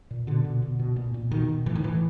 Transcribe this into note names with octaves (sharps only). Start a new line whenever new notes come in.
A#2
B2 D3
B2
B2
B2
A#2
A#2
B2 D#3
B2
A2 E3
D#3
A2 E3